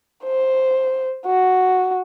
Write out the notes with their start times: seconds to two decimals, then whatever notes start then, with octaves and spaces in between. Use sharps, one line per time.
0.24 C5
1.26 F#4